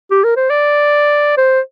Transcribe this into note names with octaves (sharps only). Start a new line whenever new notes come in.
G4
A#4
C5
D5
C5